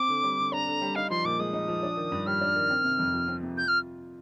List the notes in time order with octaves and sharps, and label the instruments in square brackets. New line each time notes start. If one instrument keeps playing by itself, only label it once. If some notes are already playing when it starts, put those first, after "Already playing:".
Already playing: [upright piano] C4 [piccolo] D6
[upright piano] D3
G3
D3
[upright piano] D4 [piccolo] A#5
[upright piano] D3
G3
[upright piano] D#4 [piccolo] F5
[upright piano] F3 [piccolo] C6
[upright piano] A#2 [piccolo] D6
[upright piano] G#3 [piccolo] D#6
[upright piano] D#4
F3
D4
D#3
G2
[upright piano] G3 [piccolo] F6
[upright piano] D4
D#3
C4
C3
F2
F3
C4
C3
[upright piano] F4 [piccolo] G6
[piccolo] F6